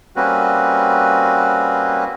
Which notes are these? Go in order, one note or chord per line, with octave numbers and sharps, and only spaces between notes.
G3 A#3 C4 C#4 F#4 B4